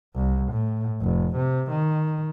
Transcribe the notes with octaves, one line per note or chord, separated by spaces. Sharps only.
C2
A2
F1
C3
D#3